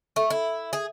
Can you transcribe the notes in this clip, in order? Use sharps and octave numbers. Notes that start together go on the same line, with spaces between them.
A3
E4
G#4